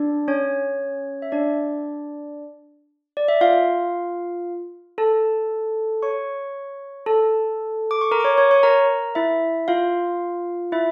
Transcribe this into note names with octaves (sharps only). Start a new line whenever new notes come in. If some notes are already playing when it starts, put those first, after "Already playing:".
Already playing: D4 D5
C#4 C#5
E5
D4 D5
D5
E5
F4 F5
A4 A5
C#5 C#6
A4 A5
D6
C#6
A#4 A#5
D6
C#5 C#6
C#5 C#6
C#5 C#6
A#4 A#5
E4 E5
F4 F5
E4 E5